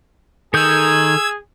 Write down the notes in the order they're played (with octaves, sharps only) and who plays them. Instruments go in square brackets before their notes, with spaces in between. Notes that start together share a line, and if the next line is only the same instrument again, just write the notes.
[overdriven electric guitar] D#3 [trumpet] G#4 [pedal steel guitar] A4 D#6 G6 [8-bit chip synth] E6 G#6